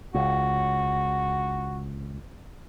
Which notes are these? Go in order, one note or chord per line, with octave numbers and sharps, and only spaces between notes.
C#2 F#4